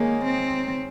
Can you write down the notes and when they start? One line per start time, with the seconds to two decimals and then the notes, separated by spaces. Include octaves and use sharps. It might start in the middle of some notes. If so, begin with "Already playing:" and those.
Already playing: D#3 G#3 A#3 C#4
0.24 C4